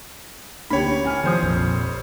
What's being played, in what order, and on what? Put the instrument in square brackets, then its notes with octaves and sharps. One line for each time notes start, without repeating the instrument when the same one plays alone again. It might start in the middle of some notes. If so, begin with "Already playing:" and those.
[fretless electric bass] D2 C#4 D4 [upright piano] A#3 G4 [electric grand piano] C#5 B5
[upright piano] A2 G#5 F6
[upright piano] F1 C5 D#6 [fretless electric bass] D#3 F3
[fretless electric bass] A#1 F2